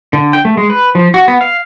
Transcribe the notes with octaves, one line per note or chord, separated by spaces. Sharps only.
D3
G5
A3
G#3
B4
F3
F#4
B3
F5